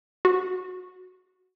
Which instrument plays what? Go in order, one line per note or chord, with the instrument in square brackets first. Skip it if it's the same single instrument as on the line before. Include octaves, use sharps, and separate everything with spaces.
[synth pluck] F#4